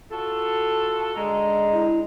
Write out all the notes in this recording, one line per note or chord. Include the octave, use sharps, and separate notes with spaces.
F4 F#4 A4 A5
D3 G#3 D#5 A#5
E4